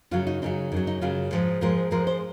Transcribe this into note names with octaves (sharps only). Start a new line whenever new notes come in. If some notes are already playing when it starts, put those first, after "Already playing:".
F#2 C#3 F#3 F4
D#4
F#2 C#3 F#3 D#4
F#2 C#3 F#3 D#4
D#4
F#2 C#3 F#3 F4
G#2 F3 G#3
G#2 F3 G#3 A#4
G#2 F3 G#3 A#4
C5